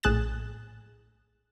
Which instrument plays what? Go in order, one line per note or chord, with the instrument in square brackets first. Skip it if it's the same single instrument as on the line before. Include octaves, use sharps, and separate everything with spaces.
[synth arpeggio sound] A#1 A2 G#4 F#6 A6 E7